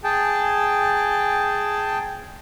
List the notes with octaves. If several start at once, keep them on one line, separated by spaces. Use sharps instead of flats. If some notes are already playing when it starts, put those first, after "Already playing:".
G#4 G5 A5